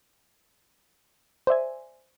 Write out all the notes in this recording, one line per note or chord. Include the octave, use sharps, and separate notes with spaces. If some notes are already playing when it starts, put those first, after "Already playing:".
C5 D5 E5 G#5